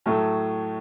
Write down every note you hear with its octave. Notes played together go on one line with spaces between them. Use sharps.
A2 F#3 A3